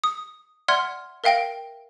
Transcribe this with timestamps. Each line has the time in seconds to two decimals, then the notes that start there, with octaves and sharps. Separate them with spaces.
0.04 D#6
0.68 D5 E5 F#5 C6 F6 G#6
1.24 A#4 E5 F5 G5 A#6 D7